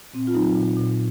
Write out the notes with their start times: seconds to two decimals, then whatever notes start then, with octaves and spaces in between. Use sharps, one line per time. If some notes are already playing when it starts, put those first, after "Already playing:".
0.14 A#2 C4
0.27 F4
0.34 F#3 D#4
0.56 A#2
0.77 A#2